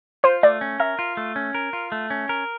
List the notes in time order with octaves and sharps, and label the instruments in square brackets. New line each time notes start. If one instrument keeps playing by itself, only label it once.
[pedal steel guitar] F4 [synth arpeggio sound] C5
[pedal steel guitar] A3 [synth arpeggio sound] D5
[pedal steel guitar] C#4
[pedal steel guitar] A#4 [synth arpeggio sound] E5
[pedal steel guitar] F4
A3
C#4
A#4
F4
A3
C#4
A#4